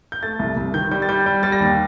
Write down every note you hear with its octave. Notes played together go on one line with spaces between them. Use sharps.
G6
A3 A6
C2
C2
D#3 G6
G3 G6
A6
G3 G6
G3 G6
G3 A6
A#6
D#2